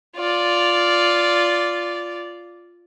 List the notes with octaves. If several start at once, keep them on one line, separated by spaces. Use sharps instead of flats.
F4 D5